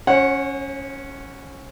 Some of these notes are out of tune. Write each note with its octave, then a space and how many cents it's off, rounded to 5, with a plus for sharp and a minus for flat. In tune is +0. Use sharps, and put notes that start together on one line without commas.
C#4 +0 C#5 -45 F#5 +0